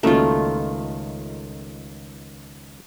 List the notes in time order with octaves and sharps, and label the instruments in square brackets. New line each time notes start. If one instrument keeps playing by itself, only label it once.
[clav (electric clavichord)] C#2 D#3 A#4 [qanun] A3 F4 [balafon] A#3 C#4 F#4